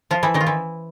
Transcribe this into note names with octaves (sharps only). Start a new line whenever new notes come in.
F3 F4
E3 E4
D#3 D#4
F4
E3 E4